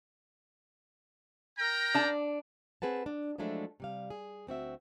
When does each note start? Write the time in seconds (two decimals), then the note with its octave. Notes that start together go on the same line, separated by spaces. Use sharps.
1.59 A#4 G5 A#5
1.95 D4 A5
2.82 C4 G#4 B4 F#5 A5
3.06 D4
3.38 F3 F#3 G#3 A3 D4 E4
3.80 C3 G3 F5
4.10 G#4
4.47 D2 C4 F#4 E5